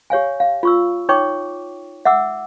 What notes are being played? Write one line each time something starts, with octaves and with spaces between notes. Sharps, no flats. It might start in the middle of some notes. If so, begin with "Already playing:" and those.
G4 C#5 F5 G#5
F5
F4 C#6 E6
D#4 C#5 G5 C#6 D6
E5 F#5 D6 E6